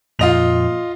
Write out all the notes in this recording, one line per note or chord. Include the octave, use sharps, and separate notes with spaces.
F2 A#2 F4 D#5 F7